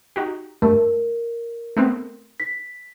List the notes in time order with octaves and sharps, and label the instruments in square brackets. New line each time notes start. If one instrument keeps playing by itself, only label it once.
[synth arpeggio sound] D#4 F#4 G4
[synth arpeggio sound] G2 A3 [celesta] A#4
[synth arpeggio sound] A3 B3 C4
[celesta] B6